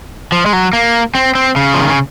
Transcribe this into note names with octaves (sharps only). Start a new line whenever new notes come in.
F3
G#3
F#3
A#3
C4
C4
C#3
F3
D#3
C#3